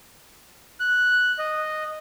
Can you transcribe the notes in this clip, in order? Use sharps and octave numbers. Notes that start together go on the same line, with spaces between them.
F#6
D#5